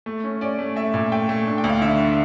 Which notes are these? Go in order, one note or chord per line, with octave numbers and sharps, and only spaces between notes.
A3
C#4
C#4 D5
A3
A3 E5
A#2
A3 G5
A3
D4
G5
D2
F5
D3 E5
D4